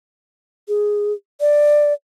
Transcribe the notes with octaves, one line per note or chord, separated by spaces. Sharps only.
G#4
D5